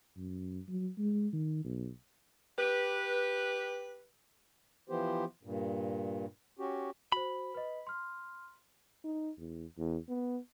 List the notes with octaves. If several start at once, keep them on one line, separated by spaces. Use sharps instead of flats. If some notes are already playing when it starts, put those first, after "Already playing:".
F#2
F#3
G#3
D#3
B1
G4 B4
E3 F3 B3 G4 C5
G2 A#2
C#4 F#4 G4
F#4 C5 B5
B4 D#5
C6 F6
D#4
E2
E2
B3